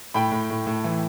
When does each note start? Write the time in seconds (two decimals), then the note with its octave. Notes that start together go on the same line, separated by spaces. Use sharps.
0.14 A2 G5 B5
0.31 A2
0.50 A2
0.67 A2
0.84 E3